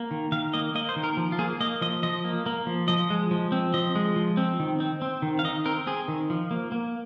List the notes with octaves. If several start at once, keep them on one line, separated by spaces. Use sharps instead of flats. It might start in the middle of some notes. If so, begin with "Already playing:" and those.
Already playing: A#3
D#3
D#3 F5
A#3 D#5
A#3 D#5
C5
D#3
A#4
F3
F4
A#3 G#4
A#3 D#5
F3 D#5
F3 D#5
A#3
A#3
F3
F3 D#5
G#3
F3
C4
F3 D#5
G#3
F3
C4
D#3
C4
C4
D#3
F5
D#3 D#5
C4 A#4
C4 G#4
D#3
F3
A#3
A#3